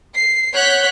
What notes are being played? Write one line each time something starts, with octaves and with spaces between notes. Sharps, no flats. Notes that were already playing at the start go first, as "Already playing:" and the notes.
C7
C#5 F#5 F#6 G6 B6